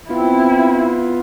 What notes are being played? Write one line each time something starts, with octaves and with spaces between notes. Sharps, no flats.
B3 C4 E4 F4